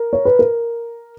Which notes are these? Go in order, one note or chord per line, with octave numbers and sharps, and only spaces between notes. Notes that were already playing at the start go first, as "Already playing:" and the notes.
Already playing: A#4
C#5
B4
A#4